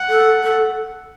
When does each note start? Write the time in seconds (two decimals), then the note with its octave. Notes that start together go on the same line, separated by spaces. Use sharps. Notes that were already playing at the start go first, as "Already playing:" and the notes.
Already playing: F#5
0.09 A4
0.43 A4